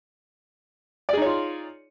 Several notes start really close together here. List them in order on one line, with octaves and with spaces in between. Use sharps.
D5 G#4 D#4 C#5 F4